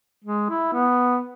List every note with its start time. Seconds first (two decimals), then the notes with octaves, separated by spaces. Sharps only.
0.24 G#3
0.50 E4
0.73 B3